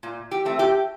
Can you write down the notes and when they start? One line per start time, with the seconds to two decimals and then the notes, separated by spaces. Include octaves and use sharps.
0.03 A#2
0.31 G4
0.45 A3 C4
0.59 G4